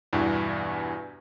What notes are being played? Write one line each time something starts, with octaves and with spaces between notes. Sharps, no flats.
E2 G2 B2 E3